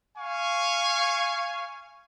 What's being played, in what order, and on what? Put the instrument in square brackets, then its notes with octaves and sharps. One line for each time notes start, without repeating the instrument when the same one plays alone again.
[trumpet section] F5 G#5 C#6